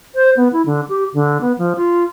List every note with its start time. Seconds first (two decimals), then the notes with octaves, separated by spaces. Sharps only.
0.15 C5
0.37 B3
0.53 E4
0.66 D3
0.89 G4
1.14 D3
1.41 B3
1.58 F3
1.76 F4